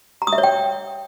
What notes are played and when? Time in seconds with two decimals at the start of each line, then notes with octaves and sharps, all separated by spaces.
0.22 A#5
0.27 D#6
0.33 E5
0.38 C#5
0.43 G5